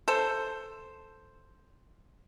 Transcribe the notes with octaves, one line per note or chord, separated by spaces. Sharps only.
A4 C5